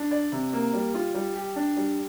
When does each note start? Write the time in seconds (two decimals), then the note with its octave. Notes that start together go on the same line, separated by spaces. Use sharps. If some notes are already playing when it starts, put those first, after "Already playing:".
Already playing: D4
0.11 D5
0.32 C3
0.53 A#3
0.73 G3
0.94 F4
1.15 G3
1.35 G4
1.56 D4
1.77 G3